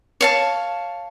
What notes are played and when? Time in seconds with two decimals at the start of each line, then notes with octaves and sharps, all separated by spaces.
0.21 C#5 F5 A5